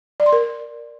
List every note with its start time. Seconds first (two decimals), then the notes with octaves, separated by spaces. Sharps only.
0.20 D5
0.26 C6
0.33 A#4